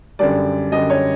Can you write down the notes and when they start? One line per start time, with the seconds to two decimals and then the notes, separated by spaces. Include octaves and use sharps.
0.19 F#2 D3 G3 D5
0.72 F#2 D3 G3 D#5
0.90 C#5